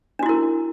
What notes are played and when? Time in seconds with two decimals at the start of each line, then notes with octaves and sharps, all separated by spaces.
0.19 D4
0.23 F#4
0.26 E4
0.29 A#4